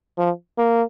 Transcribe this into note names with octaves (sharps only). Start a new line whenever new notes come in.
F3
A#3